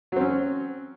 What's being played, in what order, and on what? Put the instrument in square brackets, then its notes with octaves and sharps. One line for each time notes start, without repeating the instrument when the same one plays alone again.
[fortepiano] F#3
C4
C#4